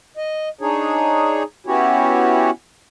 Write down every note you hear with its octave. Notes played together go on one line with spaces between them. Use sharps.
D#5
D4 D#4 G#4 C#5
B3 C#4 E4 F#4 G4 C#5